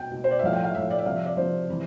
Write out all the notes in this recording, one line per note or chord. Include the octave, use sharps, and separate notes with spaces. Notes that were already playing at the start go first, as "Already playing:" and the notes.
Already playing: B2 G5
B2
C5
D5
E5
A2 F3 F5
G5
F5
A2 F3 E5
D5
E5
C3 F3 F5
E5
D5
C3 F3 C5
C3 E3